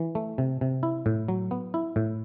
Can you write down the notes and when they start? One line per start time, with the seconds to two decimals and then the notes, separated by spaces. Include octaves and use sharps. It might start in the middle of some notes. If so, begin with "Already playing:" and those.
Already playing: E3
0.15 A3
0.38 C3
0.61 C3
0.83 E4
1.06 A2
1.28 F#3
1.51 B3
1.74 E4
1.96 A2